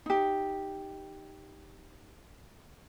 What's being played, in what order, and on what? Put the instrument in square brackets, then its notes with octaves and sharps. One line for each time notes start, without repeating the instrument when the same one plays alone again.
[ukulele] D#4 G4